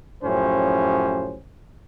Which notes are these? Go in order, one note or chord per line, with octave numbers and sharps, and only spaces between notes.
F#2 A2 F3 C#4 G4 C5